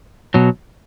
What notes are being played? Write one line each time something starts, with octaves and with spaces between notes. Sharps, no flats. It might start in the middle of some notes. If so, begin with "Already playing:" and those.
B2 F#3